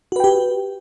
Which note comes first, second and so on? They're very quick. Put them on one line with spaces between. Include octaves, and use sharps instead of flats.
F#4 B4 G5 G4